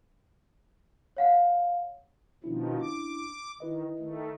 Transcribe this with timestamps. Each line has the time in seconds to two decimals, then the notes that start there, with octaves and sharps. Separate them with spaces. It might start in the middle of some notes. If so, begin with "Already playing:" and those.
1.17 C#5 F5 F#5
2.44 B2 D#3 F3 C#4 D4 E4
2.81 D6
3.60 D#3 E4 B4 D#5
3.99 D#3 A3